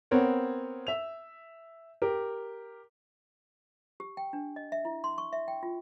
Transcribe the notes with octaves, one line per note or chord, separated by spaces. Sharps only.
B3 C4 A#4 C#5 F#5
E5 F7
G4 A#4
G4
G5
D4
D#5
E5
E4
C6
C#6
E5
G5
F4